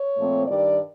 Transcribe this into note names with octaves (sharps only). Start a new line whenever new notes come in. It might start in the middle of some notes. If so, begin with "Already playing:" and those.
Already playing: C#5
A#2 F3 A3 C4
G2 D#3 G3 D5